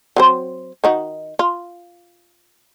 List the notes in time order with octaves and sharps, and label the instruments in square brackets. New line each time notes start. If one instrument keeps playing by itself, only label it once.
[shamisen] F#3 C4 C5
D#3 D#4 F#4
F4